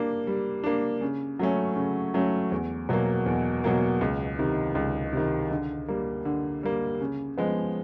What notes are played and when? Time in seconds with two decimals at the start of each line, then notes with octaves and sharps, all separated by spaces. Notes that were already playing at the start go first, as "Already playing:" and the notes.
Already playing: G3 A#3 D4
0.27 G3
0.64 A#3 D4
1.01 C#3
1.39 F#3 A3 C#4
1.76 C#3
2.14 F#3 A3 C#4
2.52 E2
2.89 B2 F#3 A#3
3.26 E2
3.64 B2 F#3 A#3
4.01 C#2
4.39 C3 D#3
4.75 C#2
5.13 C3 D#3
5.51 D3
5.88 G3 A#3
6.25 D3
6.63 G3 A#3
7.01 C#3
7.38 F3 G#3 B3